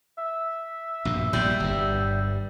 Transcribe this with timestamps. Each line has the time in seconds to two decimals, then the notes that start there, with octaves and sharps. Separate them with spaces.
0.18 E5
1.05 A#1 G2 B2
1.33 A#1 E2 A#2 G3
1.60 G1 G2